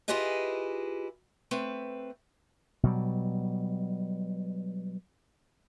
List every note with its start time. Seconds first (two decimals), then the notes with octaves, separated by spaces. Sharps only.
0.08 E4 F4 G4 G#4 B4 D#5
1.51 A3 C4 B4
2.83 B2 F#3 G3